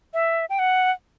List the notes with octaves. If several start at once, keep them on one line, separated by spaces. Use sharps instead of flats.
E5
G5
F#5